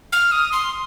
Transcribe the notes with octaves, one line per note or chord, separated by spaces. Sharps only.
F6
D#6
C6